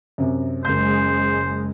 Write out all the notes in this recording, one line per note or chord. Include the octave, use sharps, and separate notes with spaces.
F#2 C3
F#1 C#3 G#3 C5 G6